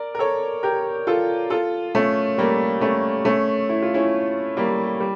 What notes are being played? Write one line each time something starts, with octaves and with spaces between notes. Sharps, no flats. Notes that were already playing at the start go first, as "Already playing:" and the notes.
Already playing: A#4 D5
A#4
A4 C#5
G4 A#4
F4 A4
F4 A4
A3 C#4
G3 A#3
A3 C#4
A3 C#4
E4
F4
C#4 E4
G3 A#3
G3